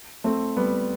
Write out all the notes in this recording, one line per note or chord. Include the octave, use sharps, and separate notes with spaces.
A3 C4
G3 B3